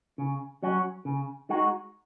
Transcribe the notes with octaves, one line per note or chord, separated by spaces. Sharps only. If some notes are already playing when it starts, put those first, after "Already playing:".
C#3
F#3 C#4 F#4
C#3
G#3 D#4 F#4